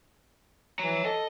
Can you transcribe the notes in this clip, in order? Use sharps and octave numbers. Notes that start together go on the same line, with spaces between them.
E3 C#5 A#5
A4 D#5